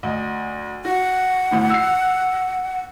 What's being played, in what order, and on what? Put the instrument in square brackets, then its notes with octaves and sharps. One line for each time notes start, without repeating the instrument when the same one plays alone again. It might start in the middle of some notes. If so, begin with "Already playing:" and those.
[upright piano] D2 D#5
[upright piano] F#4 [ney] F#5
[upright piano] G1 D2 A2
E6 C7